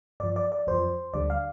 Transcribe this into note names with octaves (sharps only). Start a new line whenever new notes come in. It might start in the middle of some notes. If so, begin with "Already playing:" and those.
G2 F3 D5
D5
D5
F2 F3 C5
D2 D3 G3 D5
F5